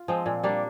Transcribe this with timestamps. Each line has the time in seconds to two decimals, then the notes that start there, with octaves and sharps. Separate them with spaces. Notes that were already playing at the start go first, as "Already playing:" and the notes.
Already playing: F4
0.08 F3 G#3 C4
0.26 A#2
0.43 G3 A#3 D4